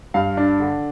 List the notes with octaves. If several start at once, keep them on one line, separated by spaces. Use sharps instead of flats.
G2 F5
D4
D3